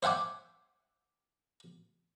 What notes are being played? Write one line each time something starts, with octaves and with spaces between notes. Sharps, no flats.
C5 E5 F#5 G#5 D6